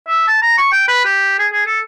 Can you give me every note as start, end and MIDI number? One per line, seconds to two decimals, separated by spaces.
0.07 0.28 76
0.28 0.41 81
0.42 0.56 82
0.58 0.69 85
0.72 0.84 79
0.88 1.02 71
1.05 1.36 67
1.39 1.47 68
1.53 1.64 68
1.66 1.80 69